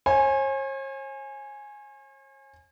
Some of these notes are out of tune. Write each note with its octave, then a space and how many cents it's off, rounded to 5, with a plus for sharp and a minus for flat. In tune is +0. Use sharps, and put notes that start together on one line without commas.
C#5 -45 G#5 +0